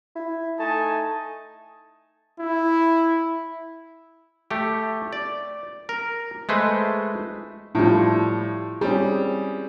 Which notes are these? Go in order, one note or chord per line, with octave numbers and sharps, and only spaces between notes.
E4
A3 D#4 G#5 A5
E4
A3 G4
D5
A#4
G#3 A3 B4 C5
A2 F3 G3 E4 F4
G3 C4 C#4 G#4